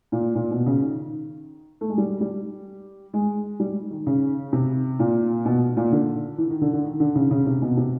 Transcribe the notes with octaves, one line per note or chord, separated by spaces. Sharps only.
A#2
A#2
B2
C#3
D#3
A3
G#3
G3
G3
G#3
G3
D#3
C#3
C3
A#2
B2
A#2
D3
E3
D#3
D3
D3
D#3
D3
C#3
C#3
C3
B2
C3